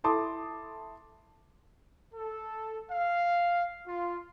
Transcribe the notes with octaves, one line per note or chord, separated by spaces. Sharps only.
E4 A4 A5 C6 D6 D#6
A4
F5
F4